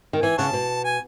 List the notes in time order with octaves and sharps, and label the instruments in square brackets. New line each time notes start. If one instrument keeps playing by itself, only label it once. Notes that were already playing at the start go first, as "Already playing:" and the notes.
[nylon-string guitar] D#3
[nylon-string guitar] E3 [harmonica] G#5
[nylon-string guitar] C#3 [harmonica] C#5 F#5 A5
[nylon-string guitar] B2
[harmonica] G#5